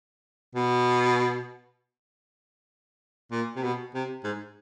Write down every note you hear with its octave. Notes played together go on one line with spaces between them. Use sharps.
B2
A#2
C3
B2
C3
G#2